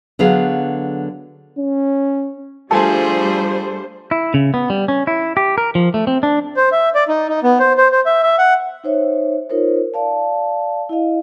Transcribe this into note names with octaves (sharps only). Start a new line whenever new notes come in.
D3 F#3 B3 G#4 F5
C#4
F3 G3 A3 D4 G#4 A4 C5 G#5
E4
C#3
B3
G3
C#4
E4
G4
A#4
F3
A3
C4
D4
C5
E5
D5
D#4
D#4
B3
C5
C5
C5
E5
E5
F#5
D#4 C5 C#5 E5
D#4 F4 A#4 C5 C#5
D5 F5 A5
E4 D#5 F5